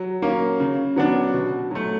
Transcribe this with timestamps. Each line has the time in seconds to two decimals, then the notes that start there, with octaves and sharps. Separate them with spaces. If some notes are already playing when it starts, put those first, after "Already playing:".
Already playing: F#3
0.22 A#3 C#4
0.60 C#3
0.96 F#3 B3 D4
1.34 B2
1.71 F#3 A3